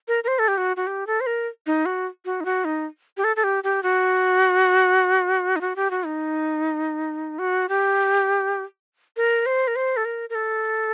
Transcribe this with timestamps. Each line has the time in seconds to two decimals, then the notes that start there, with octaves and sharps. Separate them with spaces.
0.08 A#4
0.24 A#4
0.28 C5
0.39 A4
0.48 G4
0.58 F#4
0.77 F#4
0.87 G4
1.07 A4
1.21 C5
1.27 A#4
1.67 D#4
1.86 F#4
2.25 F#4
2.41 D#4
2.45 F#4
2.65 D#4
3.17 G4
3.24 A4
3.36 A4
3.44 G4
3.64 G4
3.83 F#4
5.56 D#4
5.61 F#4
5.76 G4
5.91 F#4
6.06 D#4
7.39 F#4
7.69 G4
9.17 A#4
9.46 C5
9.68 A#4
9.76 C5
9.97 A4
10.05 A#4
10.30 A#4
10.35 A4